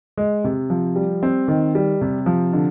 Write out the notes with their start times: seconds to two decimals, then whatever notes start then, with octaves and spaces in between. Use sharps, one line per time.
0.18 G#3
0.44 C3
0.70 F3
0.96 G3
1.23 C4
1.48 D#3
1.75 G3
2.01 C3
2.26 F3
2.53 D3